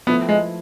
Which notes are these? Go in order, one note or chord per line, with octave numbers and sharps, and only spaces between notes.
F3 A3 B3 E4 B4
G#3